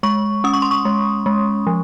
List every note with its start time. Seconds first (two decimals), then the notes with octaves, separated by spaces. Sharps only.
0.03 G#3 C#6
0.44 C#4 D#6
0.54 C#6
0.62 C6
0.71 C#6
0.85 G#3
1.26 G#3
1.67 F3